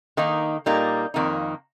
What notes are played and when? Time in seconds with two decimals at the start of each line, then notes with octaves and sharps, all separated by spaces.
0.17 D#3 A#3 D#4
0.66 A#2 G3 A#3 D#4
1.14 F2 D#3 A#3 D#4